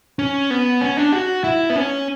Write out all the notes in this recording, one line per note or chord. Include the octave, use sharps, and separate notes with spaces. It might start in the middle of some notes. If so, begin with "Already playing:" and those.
C#4
B3
C#4
D4
F#4
E4
B3
C#4